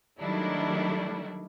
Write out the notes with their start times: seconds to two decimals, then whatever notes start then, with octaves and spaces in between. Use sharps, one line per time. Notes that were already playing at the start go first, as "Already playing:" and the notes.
0.20 D#3 F#3 G3 A3 D4 E4